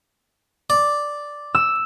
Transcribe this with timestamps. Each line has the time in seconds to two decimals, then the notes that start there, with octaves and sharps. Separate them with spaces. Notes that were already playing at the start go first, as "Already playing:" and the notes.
0.70 D5
1.55 E6